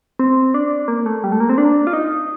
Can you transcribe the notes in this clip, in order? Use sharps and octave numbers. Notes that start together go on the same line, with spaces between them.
C4
D4
A#3
A3
G3
A3
A#3
C4
D4
F4
D#4